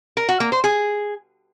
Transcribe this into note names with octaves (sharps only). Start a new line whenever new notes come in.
A#4
F#4
A#3
C5
G#4